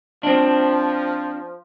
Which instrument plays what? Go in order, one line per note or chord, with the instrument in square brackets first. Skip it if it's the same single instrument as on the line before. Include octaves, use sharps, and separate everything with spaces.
[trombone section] F3 [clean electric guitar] C4 D4